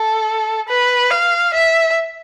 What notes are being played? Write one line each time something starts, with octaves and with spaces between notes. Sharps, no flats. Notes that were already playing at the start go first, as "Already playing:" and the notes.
Already playing: A4
B4
F5
E5